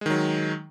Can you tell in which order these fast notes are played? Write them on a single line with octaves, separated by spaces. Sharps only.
G#3 D#3 F#3